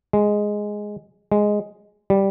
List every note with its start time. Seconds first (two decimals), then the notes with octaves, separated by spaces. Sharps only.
0.13 G#3
1.32 G#3
2.10 G3